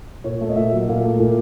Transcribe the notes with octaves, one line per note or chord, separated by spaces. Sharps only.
A#2 C#5
A3
D#5
A#2 E5
F#3
A#2 F5
A3
A#2